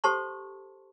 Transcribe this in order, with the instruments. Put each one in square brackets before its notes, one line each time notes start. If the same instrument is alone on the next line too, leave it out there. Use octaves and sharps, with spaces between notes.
[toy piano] G4 A4 C5 A5 C6 C#6